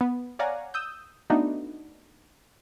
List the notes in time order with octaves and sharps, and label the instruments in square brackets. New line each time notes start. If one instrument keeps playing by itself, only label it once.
[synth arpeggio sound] B3
C#5 D5 F5 F#5 G#5 A#5
D#6 E6 G6
A3 B3 D4 D#4 F#4